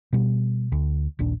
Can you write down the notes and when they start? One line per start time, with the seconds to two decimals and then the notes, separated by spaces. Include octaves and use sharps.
0.13 B2 G3
0.72 D2
1.19 D#1 A#1 D4